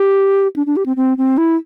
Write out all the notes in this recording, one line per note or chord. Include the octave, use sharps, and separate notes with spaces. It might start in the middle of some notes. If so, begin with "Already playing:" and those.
Already playing: G4
D4
D4
G4
C4
C4
C4
E4